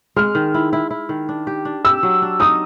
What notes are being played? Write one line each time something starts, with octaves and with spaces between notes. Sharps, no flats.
G#3 F6
D#3
E4
E4
E4
D#3
D4
G4
D4
G4 E6
F#3
D4
D#4 D#6